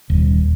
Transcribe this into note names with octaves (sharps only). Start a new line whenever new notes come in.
D#1